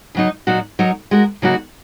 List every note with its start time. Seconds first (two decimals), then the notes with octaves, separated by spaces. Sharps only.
0.15 C#3 F#3 D#4
0.47 A#2 F#3 D#4 F#4
0.79 F#3 D#4 A#4
1.11 G#3 F#4 A#4
1.42 C#3 F#3 A#3 D#4 F#4